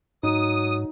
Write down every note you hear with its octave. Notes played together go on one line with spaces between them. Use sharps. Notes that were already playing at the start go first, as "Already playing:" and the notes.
G#2 F#3 D#4 D#6